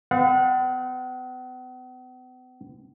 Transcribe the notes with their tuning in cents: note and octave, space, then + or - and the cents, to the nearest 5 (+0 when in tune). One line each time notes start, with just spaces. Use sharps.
B3 +45 F#5 -35